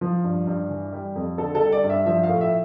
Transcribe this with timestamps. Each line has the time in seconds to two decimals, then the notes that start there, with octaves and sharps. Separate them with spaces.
0.01 F3
0.24 G2
0.47 G2
0.70 E3
0.93 G3
1.15 F2
1.38 D3 A4
1.55 A4
1.61 G3
1.72 D5
1.84 G2
1.90 E5
2.06 F3 E5
2.23 F5
2.29 A2
2.41 E5